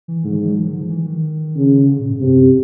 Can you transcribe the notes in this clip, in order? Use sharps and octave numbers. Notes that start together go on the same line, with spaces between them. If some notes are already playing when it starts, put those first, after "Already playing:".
E3
G#2 D3
E3
F#3
F3
D#3
D3
F3
E3
D#3
C#3
D3
A#2
G#2
G2 C3
F2
F#2